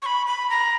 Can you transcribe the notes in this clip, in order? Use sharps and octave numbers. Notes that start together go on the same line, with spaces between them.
C#6
B5
B5
A#5